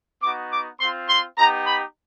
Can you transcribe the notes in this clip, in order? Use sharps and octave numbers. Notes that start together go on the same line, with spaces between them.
B3 D#4 F#4 D6
D6
C4 F4 C6
C6
B3 D#4 G4 A#5
B5